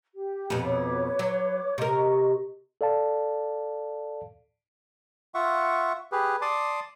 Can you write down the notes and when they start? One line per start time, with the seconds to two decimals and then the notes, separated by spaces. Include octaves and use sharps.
0.14 G4
0.50 F2 B2
0.64 B4 C#5 D6
1.19 F#3
1.78 C3 A#4 D#5 C#6
2.81 A4 D5 F5 A5
5.35 F4 E5 F#5 C#6
6.12 G4 G#4 B4
6.42 D5 A5 C6 D6 D#6